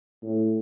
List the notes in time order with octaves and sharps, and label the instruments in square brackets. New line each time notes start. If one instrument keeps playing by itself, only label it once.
[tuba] A2